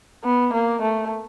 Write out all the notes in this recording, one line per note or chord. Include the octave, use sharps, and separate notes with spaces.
B3
A#3
A3